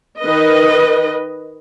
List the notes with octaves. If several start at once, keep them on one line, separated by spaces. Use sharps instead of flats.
D#3 B4 D#5